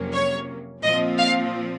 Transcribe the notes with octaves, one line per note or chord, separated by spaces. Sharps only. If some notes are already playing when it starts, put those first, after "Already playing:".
Already playing: F2 C3 F#3 A#3 C#4
C#5
A#2 F3 C4 D#5
F5